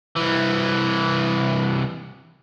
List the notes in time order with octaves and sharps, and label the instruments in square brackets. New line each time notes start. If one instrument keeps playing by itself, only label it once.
[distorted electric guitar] C2 E3